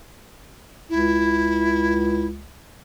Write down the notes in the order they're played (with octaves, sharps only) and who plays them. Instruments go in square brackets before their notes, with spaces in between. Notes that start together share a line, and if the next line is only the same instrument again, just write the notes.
[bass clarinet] C#2 [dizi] E4